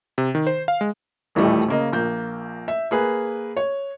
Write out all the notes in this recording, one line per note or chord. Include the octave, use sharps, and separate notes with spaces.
C3
D#3
C5
F5
G#3
D#1 A1 A2 G3 A3
C#3 A#3 D#5
A#1 A#3 G6
E5
A#3 G#4 B4
C#5